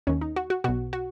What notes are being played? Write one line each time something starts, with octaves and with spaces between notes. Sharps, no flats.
D#2 D#3 C#4
D#4
F#4
F#4
B1 B2 F#4
F#4